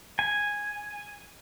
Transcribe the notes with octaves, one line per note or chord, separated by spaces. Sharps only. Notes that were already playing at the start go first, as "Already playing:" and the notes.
G#5